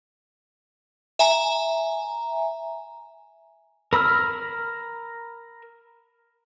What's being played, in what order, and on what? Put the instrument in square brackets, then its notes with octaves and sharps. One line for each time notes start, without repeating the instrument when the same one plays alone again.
[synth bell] E5 G#5 A#5
[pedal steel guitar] A#4 B5 E6 F6